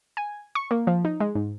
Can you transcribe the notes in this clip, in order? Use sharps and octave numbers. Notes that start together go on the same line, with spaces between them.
G#5
C#6
A#3
F3
D#4
G#3
G#2